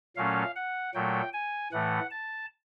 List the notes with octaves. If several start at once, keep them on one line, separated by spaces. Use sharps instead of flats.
A#2 F#3 A3 C#4 F5
F#5
A#2 F#3 A3 G5
G#5
A2 E3 A3 F#5
A5